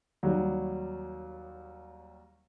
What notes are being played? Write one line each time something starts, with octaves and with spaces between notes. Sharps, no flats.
D#2 F#3 G3